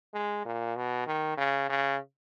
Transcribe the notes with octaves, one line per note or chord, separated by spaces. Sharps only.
G#3
A#2
B2
D#3
C#3
C#3